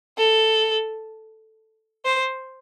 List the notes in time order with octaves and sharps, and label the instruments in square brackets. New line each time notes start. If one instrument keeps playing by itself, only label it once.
[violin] A4
C5